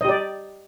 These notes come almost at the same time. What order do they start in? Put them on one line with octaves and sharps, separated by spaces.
D#5 G4 D5